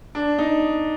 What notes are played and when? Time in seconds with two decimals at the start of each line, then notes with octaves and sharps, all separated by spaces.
0.15 D4
0.38 D#4